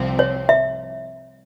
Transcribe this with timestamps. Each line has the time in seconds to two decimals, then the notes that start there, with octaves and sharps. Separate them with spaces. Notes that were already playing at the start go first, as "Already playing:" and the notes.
Already playing: C2 C3 F3 C4
0.19 C#5
0.49 E5